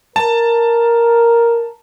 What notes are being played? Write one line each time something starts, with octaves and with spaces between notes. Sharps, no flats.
A#4 A5